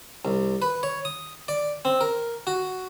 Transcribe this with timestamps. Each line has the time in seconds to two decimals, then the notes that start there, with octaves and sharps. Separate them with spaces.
0.25 C2
0.62 B4
0.83 C#5
1.05 D#6
1.48 D5
1.85 C4
2.01 A#4
2.47 F#4